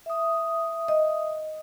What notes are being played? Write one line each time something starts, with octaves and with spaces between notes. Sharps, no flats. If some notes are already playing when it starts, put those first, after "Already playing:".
E5 D#6
D#5